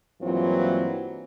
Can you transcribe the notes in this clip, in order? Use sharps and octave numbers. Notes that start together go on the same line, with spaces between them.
G2 E3 F#3 A#3 C4 F4